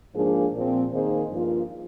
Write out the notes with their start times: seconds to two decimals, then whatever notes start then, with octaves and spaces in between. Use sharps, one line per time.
0.15 G#2 F3 A#3 D4 G#4
0.54 A#2 F3 C4
0.92 D#3 A#3 D#4 G#4 C5
1.31 G2 F3 A#3 F4